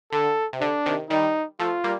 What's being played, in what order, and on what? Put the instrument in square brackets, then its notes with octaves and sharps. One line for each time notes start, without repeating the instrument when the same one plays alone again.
[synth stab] D3 [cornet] A4
[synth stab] C3
[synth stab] D3 [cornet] D4
[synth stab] C3 D#3
[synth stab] D#3 G3 [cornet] D#4
[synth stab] F3 A3 [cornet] F4
[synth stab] G3 A#3